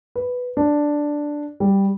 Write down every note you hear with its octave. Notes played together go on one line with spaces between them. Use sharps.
B4
D4
G3